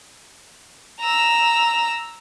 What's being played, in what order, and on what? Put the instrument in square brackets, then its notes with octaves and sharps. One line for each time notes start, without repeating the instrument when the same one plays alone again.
[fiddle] A#5 E6